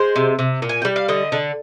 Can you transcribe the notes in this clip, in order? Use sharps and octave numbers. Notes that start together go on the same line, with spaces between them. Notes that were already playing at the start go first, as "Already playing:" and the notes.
Already playing: G#3 C5
C3
C3
A#2
G#5
G3 G5
F5
D3 D#5
D3